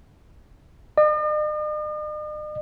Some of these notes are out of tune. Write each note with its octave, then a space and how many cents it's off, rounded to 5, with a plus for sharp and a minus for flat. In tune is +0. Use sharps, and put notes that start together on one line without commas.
D#5 -45